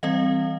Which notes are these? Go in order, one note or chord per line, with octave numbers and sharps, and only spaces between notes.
E3 G3 C4 D#5 F5